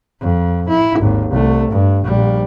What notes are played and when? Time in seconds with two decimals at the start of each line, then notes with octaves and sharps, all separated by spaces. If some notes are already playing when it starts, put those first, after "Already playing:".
0.21 F2
0.69 E4
0.99 G#1 D#2
1.30 C2 A3
1.71 G2
2.04 A#1 G3